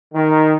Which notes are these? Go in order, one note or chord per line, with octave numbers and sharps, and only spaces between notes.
D#3